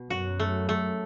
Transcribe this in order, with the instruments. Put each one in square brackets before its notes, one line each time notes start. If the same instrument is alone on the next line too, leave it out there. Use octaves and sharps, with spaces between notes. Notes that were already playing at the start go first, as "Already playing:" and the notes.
Already playing: [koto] B2
[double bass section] F#2 [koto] F#4
[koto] A3
A3